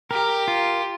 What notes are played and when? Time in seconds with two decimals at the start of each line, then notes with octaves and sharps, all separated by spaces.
0.11 G4 A#4
0.48 F4